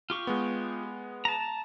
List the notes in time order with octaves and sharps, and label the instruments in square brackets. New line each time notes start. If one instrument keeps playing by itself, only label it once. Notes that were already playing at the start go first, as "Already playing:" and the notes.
[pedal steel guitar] F4 G4 C#6
[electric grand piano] G#3 B3
[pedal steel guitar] A5 A#5